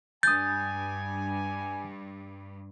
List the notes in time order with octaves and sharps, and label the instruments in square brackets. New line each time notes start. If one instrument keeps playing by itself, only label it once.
[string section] G2 [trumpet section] G#5 [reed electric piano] D#6 A6 [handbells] G6